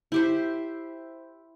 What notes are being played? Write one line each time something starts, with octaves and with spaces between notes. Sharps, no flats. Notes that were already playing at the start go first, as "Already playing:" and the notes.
E4 G4 C5